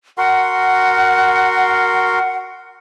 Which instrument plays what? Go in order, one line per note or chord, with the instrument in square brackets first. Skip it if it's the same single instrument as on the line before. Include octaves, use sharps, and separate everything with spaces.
[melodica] F#4 A#4 C6 [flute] F#5